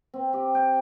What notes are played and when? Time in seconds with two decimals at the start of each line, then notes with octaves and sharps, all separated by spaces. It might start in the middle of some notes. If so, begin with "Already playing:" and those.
0.14 C4
0.33 G4
0.55 G5